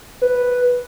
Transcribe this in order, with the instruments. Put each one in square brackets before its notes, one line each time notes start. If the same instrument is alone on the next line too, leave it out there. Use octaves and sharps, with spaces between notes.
[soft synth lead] B4